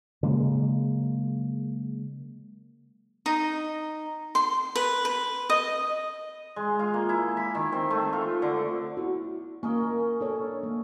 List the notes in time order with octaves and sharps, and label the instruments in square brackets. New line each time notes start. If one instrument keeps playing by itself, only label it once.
[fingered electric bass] C#3 F#3 G#3 A#3
[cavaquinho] D#4
C6
B4
B4
D#5
[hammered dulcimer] G#3
F4
A#3
E4
B5
D#3
C4
A3
F4
D3
[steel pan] E4 F#4
[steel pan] A#3 [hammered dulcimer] C#4 A#4 D#5
[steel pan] D4 A4 C#5
A#3